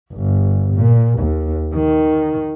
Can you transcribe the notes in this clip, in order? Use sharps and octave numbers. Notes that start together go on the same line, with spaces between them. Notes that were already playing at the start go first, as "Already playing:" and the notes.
G1
A#2
D#2
D#3